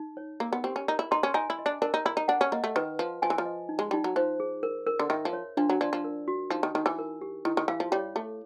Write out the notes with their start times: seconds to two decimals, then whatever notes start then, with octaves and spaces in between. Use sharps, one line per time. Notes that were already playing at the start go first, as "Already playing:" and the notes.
Already playing: D#4
0.17 C#5
0.40 A#3 A#4
0.53 B3
0.64 C4 G4
0.76 C#4
0.88 D#4 A#4
0.99 E4
1.11 D#4 C6
1.23 C#4
1.34 D#4 G#5
1.50 E4
1.59 D#5
1.66 D4
1.82 D4 A#4
1.94 D#4
2.05 E4 A#5
2.17 D#4
2.28 D4 F#5
2.41 C#4
2.52 A#3 D#5
2.64 A3
2.76 D#3 B4
2.99 F3 B4
3.22 F3 G#5
3.30 E3
3.38 F3
3.45 D#5
3.69 D#4
3.79 G#3
3.91 G3 D#4
4.04 F#3
4.16 F3 C5
4.40 G#4
4.63 A#4
4.87 A#4
4.99 D3
5.10 D#3 E5
5.25 F3
5.33 C#5
5.57 F3 D4
5.69 F#3
5.81 F3 D5
5.93 F3
6.04 A#4
6.28 F#4
6.50 F3 D#4
6.63 D#3
6.75 D#3 D#4
6.86 E3
6.99 A#4
7.21 G4
7.45 D#3 E4
7.57 D#3
7.68 E3 F5
7.80 F3
7.92 G3 C#5
8.15 A3 A4